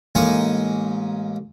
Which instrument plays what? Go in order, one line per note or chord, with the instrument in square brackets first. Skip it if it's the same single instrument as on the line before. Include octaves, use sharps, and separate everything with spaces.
[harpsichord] A1 G#3 A#3 D#4 G#5 C#6